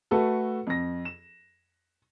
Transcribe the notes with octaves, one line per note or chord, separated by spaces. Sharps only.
A3 F#4 A4 B4
F2 A#6
E7